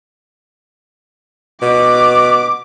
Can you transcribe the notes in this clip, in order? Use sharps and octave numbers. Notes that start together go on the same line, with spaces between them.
B2 D6